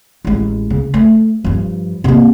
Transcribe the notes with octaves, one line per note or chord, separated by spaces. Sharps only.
A1 G#3
C#3
A3
G2 F3
C3 A#3